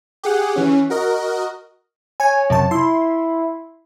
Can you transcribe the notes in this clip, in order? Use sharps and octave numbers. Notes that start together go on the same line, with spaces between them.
G4 G#4 F#5
E3 C#4
F#4 A#4 D#5
C#5 G#5
F#2 C3 A5
E4 C6